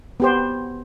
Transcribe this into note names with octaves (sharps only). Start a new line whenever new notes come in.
B3 G4 C5